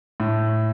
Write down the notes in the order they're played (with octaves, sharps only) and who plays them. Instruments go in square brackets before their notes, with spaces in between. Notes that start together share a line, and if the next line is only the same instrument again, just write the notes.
[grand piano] A2